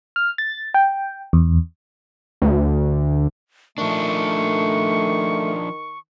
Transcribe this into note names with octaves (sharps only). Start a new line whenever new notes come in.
F6
A6
G5
E2
D2
D#3 F3 A3 D4 C#6